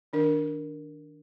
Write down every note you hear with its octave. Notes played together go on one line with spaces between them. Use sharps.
D#3 D4 A#4